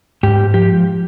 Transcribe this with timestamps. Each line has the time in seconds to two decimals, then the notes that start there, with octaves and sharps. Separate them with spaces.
0.23 G#2 G4
0.54 F3 G4